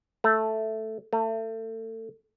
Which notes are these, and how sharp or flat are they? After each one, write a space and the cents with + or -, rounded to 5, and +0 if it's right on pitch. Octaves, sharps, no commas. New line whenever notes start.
A3 +0
A3 +30